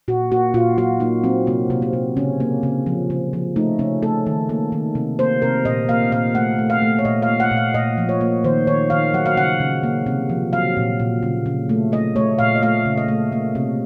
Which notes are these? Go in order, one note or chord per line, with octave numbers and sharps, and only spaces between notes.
A#2 F#4
A#3 F#4
A#2 F4
F#3 F#4
A#3 D#4
F#3 C4
C3 A#3
C3
C4
C3
C#3 C#4
A#3
C#3
F3
C#3
F3
A3 D#4
C#3 C#4
A3 A4
D#3
A#3
D#3
C3
A#3 C5
C3 A#4
A#2 D#5
A#3 F5
A#2 F5
A3 F#5
A3
F5
A3
C#5
A#2 D#5
F5
A#3
F#5
A#2
F5
A#2 D#5
F3
C#5
A#3
D#3 C5
D#3 C#5
D#3 F5
F#3 F#5
F5
C#3 F#5
C#3
A#3
C3
F3
F#3 F5
A#2
A#2
C#3
C#3
A3
A3 D#5
A3 C#5
A#2 F5
D#5
A3 F5
C#3
D#5
A3
A#3
C3